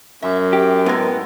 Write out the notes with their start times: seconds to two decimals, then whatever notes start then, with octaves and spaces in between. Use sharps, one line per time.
0.22 F#2 E5
0.53 G4
0.86 A2 G#3 B3 A#4